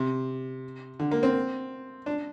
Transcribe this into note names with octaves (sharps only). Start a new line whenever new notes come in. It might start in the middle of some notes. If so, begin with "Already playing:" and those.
Already playing: C3
D3
A#3
C4
D4